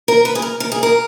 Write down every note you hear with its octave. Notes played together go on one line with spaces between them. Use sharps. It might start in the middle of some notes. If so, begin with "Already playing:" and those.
A#4
B4
G#4
A#4
A#4
G#4
A#4